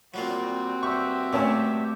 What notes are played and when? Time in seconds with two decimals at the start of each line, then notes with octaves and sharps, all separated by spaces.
0.14 A#2 F#3 G3 A#3 C4 F4 F#4
0.83 G2 G4 E5 C#6
1.33 A#2 A3 C#4 A5